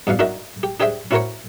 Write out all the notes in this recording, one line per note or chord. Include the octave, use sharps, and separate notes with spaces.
E2 G2 B2 F5
D4 D#4 F#4 A#4 E5
G4
D4 G4 G#4 C5 E5 G5
C#4 E4 F#4 A#4 C5 C#5